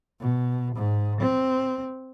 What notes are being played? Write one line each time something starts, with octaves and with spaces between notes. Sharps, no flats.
B2
G#2
C4